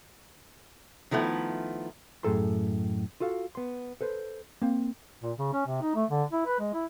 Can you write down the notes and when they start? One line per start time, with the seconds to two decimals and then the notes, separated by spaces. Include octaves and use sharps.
1.11 D#3 F3 A3 B3 E4
2.23 F#2 A2 G#4 A4 A#5 C6
3.20 F4 F#4 A4 F5
3.55 B3 C6
4.01 A4 B4 C5
4.62 A#3 C4
5.23 A#2
5.38 C#3
5.53 C#4
5.66 C3
5.82 D#4
5.95 A3
6.10 D3
6.32 E4
6.47 B4
6.59 G#3
6.73 E4